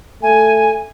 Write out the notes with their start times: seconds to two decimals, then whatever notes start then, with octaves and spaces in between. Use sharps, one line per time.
0.23 A3 G#5